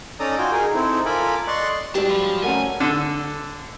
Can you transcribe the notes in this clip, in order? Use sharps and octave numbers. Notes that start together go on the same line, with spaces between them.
C#4 D#4 A4 D5 A#5 D#6
F4 F#4 G5 G#5
D#4 G#4 A#4 G#5
C4 D#4 E4 A4
F4 A4 A#4 G#5 B5 D6
D5 D#5 C6 C#6 F#6
G#2 F#3 G3 D4 G4 D5
F3 B5
A3 C#4 A#4 F#5 G#5 A#5
D3